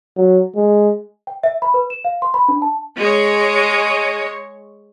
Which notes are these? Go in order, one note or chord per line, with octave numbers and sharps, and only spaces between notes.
F#3
G#3
G5
E5
B5
B4
E7
F5
C6
B5
D4
A5
G#3 C#5